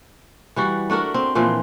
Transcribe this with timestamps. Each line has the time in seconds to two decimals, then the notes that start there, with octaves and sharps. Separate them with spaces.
0.56 E3 G3 F#4
0.90 A3 D4 F#4 A#4
1.14 C4
1.35 A#2 E3 F3 C4